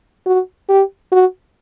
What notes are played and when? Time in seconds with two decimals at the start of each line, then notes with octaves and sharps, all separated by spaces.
0.26 F#4
0.69 G4
1.12 F#4